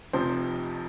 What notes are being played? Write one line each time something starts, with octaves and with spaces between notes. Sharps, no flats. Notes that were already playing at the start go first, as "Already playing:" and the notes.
F1 F2 C3 F3 C5